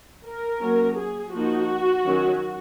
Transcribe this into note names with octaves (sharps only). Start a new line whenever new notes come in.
A#4
F#3 A#3 C#4
G#4
F3 A#3 D#4 F#4
D#3 F#3 C#4